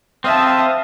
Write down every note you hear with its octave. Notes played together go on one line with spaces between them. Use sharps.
C4 E5 F5 A5 D#6